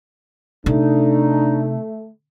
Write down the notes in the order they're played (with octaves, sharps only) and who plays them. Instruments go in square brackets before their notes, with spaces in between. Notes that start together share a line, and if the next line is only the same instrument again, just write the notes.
[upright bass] C3 [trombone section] A3 [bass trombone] D4 [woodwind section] D#4